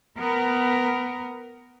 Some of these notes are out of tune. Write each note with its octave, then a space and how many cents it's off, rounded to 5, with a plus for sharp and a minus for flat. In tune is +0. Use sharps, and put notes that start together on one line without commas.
B3 +15 A#4 +0